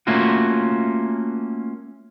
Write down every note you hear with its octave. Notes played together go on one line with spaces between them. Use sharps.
A3 A#3 C#4 F4 F#4